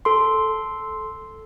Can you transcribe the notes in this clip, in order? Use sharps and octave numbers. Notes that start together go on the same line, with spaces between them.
A4 C6